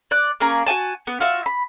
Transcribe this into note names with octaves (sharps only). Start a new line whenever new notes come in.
D5 F#6
A#3 C#4 G#4 A#5
F#4 D#5 G#5 A5
B3
F4 F#4 E5
B5